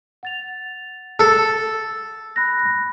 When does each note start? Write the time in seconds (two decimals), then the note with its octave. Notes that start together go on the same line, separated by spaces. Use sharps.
0.23 F#5 A6 F7
1.19 A4
2.36 B5 F#6 A#6